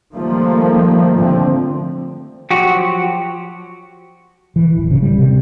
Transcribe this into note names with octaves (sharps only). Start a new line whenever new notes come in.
D#3 F3 G3 A3 A#3
D3 F3 C4
F3 F#3 F#4 G4
E3
D1
C#3
G3
C3